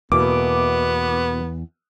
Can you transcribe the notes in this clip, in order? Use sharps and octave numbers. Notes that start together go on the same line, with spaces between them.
E2 B2 E3 A#3 B3 D6